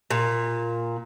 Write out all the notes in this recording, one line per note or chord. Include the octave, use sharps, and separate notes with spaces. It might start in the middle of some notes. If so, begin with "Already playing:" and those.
A#2